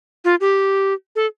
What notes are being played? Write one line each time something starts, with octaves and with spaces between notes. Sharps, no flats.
F4
G4
A4